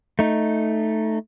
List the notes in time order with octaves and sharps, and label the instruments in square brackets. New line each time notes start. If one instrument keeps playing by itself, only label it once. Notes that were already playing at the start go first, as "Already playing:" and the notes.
[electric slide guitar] A3 D#4